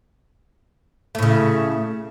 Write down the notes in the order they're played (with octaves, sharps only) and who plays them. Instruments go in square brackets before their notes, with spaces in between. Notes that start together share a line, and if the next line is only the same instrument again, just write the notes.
[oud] A3
A2
C#3